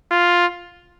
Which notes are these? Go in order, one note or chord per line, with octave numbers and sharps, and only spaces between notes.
F4